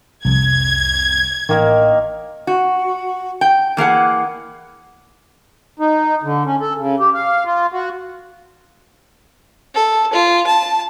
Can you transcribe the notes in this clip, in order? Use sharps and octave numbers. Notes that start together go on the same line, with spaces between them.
C2 F2 G#6
A1 D#3 A#3 D#4
F#4
G5
E3 A#3 G#4 F#5
D#4
D3
C#4
A4
C#3
G4
F5
F4
F#4
A4
F4
A5